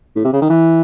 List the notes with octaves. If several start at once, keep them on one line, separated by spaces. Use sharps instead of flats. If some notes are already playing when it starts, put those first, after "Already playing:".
A2
C3
C#3
D#3
E3